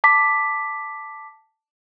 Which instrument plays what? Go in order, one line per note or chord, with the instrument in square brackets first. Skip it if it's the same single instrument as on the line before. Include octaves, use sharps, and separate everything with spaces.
[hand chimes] A5 D6 B6